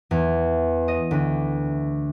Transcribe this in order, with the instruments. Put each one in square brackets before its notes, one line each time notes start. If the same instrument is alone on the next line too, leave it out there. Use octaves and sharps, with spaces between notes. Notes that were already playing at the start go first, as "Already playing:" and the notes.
[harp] E2
D#5
D2